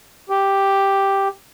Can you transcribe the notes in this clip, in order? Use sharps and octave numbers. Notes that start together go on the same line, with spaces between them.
G4